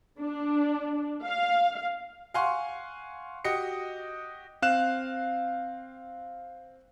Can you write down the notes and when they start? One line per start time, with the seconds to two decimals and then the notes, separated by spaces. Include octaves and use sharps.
0.19 D4
1.24 F5
2.34 F5 F#5 G#5 C6 C#6
3.44 F#4 G4 D#5 C#7
4.62 C4 F5 F#6 E7